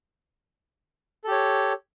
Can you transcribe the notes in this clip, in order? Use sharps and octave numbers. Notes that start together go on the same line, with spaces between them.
G4 A4 C#5